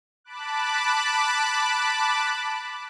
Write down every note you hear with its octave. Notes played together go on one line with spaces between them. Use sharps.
A5 B5 D6 F#6